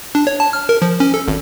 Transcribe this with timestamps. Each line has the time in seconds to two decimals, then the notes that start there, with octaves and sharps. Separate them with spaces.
0.15 D4
0.27 C#5
0.40 A5
0.53 F6
0.69 A#4
0.82 F3
1.00 C#4
1.14 A4
1.28 G#1